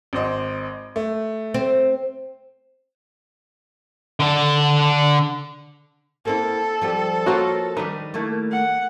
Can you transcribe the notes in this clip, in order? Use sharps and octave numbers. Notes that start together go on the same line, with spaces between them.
G#1 C5 D#5
A3
C4
D3 A4
A#3 C4 E4 A4
F3 G3 C4
A#3 F4 F#4 C5 C#5
D#3 G3 D4 D#4 B4
A3 A#3 E4
F#5